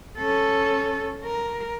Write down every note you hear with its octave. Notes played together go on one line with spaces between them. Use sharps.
C#4 A4
A#4